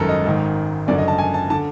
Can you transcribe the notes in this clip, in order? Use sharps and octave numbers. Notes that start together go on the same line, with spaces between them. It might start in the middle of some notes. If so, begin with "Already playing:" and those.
Already playing: G#1 F#2 D#3 A4 A#4
D#5
G#1 G#2 D#3
F#1 F#2 D3 D5
D#5
A5
G#5
A5
D3 A5